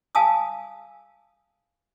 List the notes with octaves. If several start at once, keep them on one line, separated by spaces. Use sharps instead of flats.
F5 G#5 A5 D#6 E6